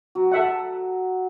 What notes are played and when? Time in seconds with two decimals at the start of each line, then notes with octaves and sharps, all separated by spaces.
0.15 F#3
0.32 A4 E5 F#5